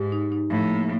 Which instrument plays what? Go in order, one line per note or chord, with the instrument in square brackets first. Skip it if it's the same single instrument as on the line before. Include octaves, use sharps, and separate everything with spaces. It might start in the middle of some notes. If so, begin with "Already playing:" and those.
Already playing: [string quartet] G#2 [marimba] G4
[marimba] D#4
D#4
[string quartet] A2 [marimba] F3
[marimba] A#3